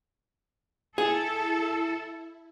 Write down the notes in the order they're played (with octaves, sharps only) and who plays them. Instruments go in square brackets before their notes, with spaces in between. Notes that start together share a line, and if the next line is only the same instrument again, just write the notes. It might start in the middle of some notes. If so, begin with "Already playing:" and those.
[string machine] E4 [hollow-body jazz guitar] G#4 [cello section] A4